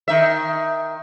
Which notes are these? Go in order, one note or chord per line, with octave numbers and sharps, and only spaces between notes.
D#3 E5